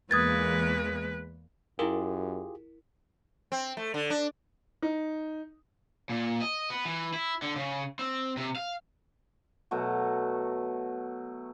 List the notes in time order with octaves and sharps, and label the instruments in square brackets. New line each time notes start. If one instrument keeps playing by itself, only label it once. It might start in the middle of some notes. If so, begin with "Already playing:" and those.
[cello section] E2 A#3 [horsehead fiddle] G#3 B4 [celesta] D#6 G#6 A6
[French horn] F#2 [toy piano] E4 A#4 [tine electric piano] F4 G4 G#4
[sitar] C4
A3
D3
D4
[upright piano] D#4
[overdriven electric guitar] A#2
D#5
B3
E3
E4
D3
C#3
C4
C3
F5
[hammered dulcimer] B2 F#3 A3 F#4